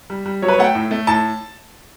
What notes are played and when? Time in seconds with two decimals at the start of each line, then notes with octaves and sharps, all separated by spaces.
0.10 G3
0.26 G3
0.42 F#3 C#5
0.48 B4
0.53 C#5
0.58 A3 F#5
0.64 G5
0.75 A2
0.91 A3
1.07 A2 A5